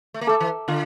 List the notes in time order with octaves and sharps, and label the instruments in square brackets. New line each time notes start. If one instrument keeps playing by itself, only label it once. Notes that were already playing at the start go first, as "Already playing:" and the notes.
[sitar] A3
A#3
[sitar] A3 [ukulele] A4
[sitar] E3
[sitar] D3 [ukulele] F4